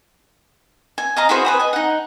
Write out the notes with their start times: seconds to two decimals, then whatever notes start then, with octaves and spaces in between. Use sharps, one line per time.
0.98 G#5
1.17 D#5 F5 A#5
1.29 E4 F#4 G#4 C5
1.45 B4 G#5 D#6
1.59 D#5 G#5
1.73 D#4 F#5